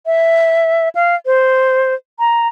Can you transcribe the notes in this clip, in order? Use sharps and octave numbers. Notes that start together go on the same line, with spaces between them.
E5
F5
C5
A#5